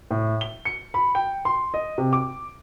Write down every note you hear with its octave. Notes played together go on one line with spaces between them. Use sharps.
A2
G7
C#7
B5
G5
C6
D#5
C3
D6